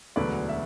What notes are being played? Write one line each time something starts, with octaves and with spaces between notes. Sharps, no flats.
E1 D2 D3 F#3 B4 D5
E5